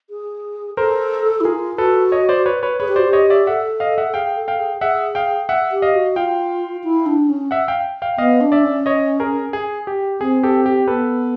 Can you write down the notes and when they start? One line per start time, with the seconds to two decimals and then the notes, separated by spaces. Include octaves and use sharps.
0.10 G#4
0.77 A4 A#4 C5
1.41 E4
1.45 F4 G#4 A#4
1.78 F#4 A4 B4
2.12 C#5 D#5
2.29 C5 D5
2.46 B4 C#5
2.63 B4 C#5
2.80 G#4 B4 C#5
2.88 G4
2.96 F#4 C5 D5
3.06 G4
3.13 C#5 D#5
3.30 D5 E5
3.47 A4 E5 F#5
3.80 D#5 F5
3.98 E5 F#5
4.14 G#4 F5 G5
4.37 A4
4.48 F5 G5
4.59 G#4
4.81 G#4 E5 F#5
5.15 F5 G5
5.49 E5 F#5
5.72 G4
5.82 D#5 F5
5.94 F#4
6.16 F4 F5 G5
6.84 E4
7.06 D4
7.29 C#4
7.51 E5 F#5
7.68 F5 G5
8.02 F5 G5
8.18 B3 D#5 F5
8.41 D4
8.52 D5 E5
8.64 C#4
8.86 C#5 D#5
9.20 G#4 A#4
9.53 G#4
9.87 G4
10.20 C4 G#4
10.43 G4 A4
10.66 G4
10.87 B3 A4 B4